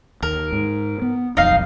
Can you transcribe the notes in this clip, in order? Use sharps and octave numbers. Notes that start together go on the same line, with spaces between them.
D#2 A#4
G#2
B3
D#1 B1 F2 D#4 F5